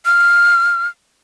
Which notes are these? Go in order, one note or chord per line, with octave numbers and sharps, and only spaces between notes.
F6